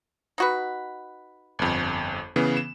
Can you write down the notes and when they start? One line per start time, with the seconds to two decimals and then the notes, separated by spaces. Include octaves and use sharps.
0.38 D#4 F#4 B4
1.59 G1 F2
2.36 C#3 E3 B3
2.57 E7